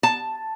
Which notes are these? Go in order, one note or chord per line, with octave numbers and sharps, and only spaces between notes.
A5